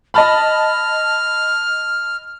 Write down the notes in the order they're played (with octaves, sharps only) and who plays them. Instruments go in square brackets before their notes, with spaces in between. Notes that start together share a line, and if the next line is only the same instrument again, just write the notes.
[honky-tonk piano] D#5 A5 B5 [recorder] F6